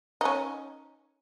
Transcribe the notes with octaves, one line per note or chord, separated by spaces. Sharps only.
C#4 D#4